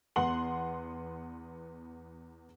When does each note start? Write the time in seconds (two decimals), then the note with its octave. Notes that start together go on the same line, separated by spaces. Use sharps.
0.16 E2 B3 F#5 C6 F#7